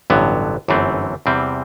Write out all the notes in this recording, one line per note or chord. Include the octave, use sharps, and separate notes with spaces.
A1 G2 D3 F#3 B3
G1 F#2 E3 A3 C4
E2 C3 E3 G3 C4